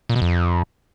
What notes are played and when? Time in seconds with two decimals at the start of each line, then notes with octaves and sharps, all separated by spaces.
0.09 A#2
0.16 B2
0.22 F2